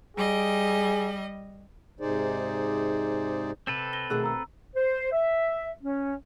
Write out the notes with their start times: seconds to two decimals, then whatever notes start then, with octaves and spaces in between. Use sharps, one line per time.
0.17 G3 G#4 D#5
2.00 G#2 C3 D#4 G#4 C5 D5
3.67 C3 C4 A4 B4
3.93 A#6 G7
4.10 B2 D#3 A3 G#4 E6 F#6
4.24 A#5 E6
4.76 C5
5.12 E5
5.83 C#4